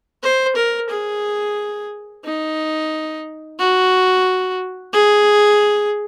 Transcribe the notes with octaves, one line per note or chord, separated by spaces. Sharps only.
C5
A#4
G#4
D#4
F#4
G#4